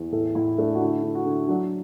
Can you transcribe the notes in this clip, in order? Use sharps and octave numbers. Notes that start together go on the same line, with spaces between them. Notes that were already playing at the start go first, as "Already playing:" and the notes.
Already playing: E2
A2 A4
A2 E4
A3 D4
F#4
D3 E4
D3
F#4
D3
F#3 D4